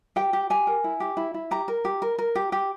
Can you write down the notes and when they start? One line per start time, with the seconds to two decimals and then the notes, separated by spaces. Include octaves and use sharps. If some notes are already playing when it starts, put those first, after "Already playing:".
0.16 G4 G5
0.33 G4
0.50 G4 G#5
0.67 A#4
0.84 E4
1.00 G4
1.17 E4
1.34 E4
1.51 G4 A#5
1.68 A#4
1.85 G4
2.02 A#4
2.18 A#4
2.35 G4
2.52 G4